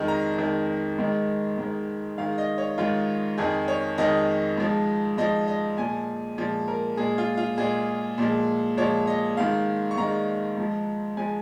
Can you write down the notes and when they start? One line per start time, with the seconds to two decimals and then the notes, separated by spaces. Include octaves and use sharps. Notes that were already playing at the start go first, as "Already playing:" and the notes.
Already playing: F2 D#3 G#3
0.08 A#5
0.38 F2 D#3 G#3
0.98 G#2 D#3 G#3
1.58 G#2 D#3 G#3
2.18 G#2 D#3 G#3 F5
2.38 D#5
2.58 C#5
2.78 G#2 D#3 G#3 F4
3.38 F2 D#3 G#3 G#4
3.68 C#5
3.98 F2 D#3 G#3 D#5
4.58 G#2 F3 G#3
5.18 G#2 F3 G#3 D#5
5.47 D#5
5.78 A#2 F3 G#3 G#5
6.38 A#2 F3 G#3
6.68 A#4
6.97 A#2 G#3 G#4
7.18 F4
7.37 F4
7.58 A#2 G#3 G#4
8.18 A#2 F3 G#3
8.77 A#2 F3 G#3 C#5
9.07 D#5
9.37 G#2 D#3 G#3 F5
9.91 C#6
9.97 G#2 D#3 G#3 A#5
10.57 G#2 F3 G#3
11.17 F3 G#3 G#5